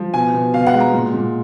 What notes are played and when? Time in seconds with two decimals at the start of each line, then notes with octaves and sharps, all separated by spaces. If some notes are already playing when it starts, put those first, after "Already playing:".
Already playing: F3
0.14 B2 G#5
0.33 B2
0.54 B2 F5
0.66 F#5
0.73 G#3
0.80 A#5
0.93 A#2
1.14 A#2